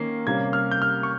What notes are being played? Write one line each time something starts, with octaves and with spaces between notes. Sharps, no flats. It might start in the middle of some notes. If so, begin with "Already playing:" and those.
Already playing: D#3 A#3 C#4 C7
C3 G3 A#3 C#4 G#6
F6
G6
F6
C#6